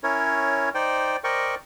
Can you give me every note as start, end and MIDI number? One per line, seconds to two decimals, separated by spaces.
0.03 0.69 61
0.03 0.69 64
0.03 0.69 70
0.03 0.69 73
0.74 1.17 63
0.74 1.17 72
0.74 1.17 74
0.74 1.17 79
1.24 1.55 70
1.24 1.55 72
1.24 1.55 74
1.24 1.55 75
1.24 1.55 79
1.24 1.55 85